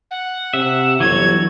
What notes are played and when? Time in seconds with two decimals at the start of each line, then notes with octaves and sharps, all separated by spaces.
0.11 F#5
0.53 C3 E5
1.00 G1 E3 F#3 C#5 G#6